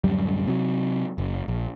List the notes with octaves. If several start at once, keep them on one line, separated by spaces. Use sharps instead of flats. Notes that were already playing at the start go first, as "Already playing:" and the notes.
D1 F#2 G3
C3 F#3
F#1
A#1